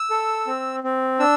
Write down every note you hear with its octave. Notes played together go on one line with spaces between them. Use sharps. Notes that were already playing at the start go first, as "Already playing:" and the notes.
Already playing: E6
A4
C4
C4
D4 E6